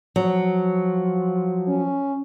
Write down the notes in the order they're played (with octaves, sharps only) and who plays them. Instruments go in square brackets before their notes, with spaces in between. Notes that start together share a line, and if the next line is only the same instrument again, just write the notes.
[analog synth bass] F3 [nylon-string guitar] F#3
[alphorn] C#4